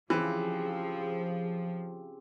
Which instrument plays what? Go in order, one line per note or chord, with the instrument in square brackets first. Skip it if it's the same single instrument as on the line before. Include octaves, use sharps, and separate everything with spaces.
[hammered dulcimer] C#3 C4 G4 [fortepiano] E3 [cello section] F3 [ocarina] G#4